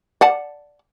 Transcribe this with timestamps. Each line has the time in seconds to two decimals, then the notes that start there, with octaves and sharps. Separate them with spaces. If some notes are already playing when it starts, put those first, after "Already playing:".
0.21 D5 F#5 A5